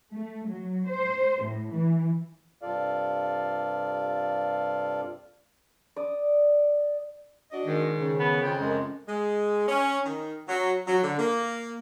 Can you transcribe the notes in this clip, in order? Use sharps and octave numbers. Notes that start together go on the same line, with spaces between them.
A3
F#3
C5
A2
E3
G2 C3 F4 A4 D5 F5
D5 D#6
D4 F#4 D#5
G#2 D#3
C#3
B3
F2 G5
F#2 D#3 G#3
G#3
C#4
D#3
F#3
F#3
D3
A#3